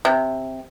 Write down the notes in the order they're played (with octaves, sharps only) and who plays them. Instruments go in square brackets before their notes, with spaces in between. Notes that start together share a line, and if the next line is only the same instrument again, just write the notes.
[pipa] C3